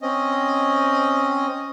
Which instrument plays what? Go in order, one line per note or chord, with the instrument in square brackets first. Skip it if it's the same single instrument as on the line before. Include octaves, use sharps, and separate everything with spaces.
[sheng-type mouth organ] C4 C#4 D#5